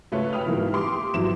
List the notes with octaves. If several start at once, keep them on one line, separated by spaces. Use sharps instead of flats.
C#2 A3 F4 B4 C#5
E5 G5 B5 D#6 F6
G#2 B2 E3 A#3 B3 E4
G4 C6 D6 D#6
G#1 E2 F3 F#3 E4 E7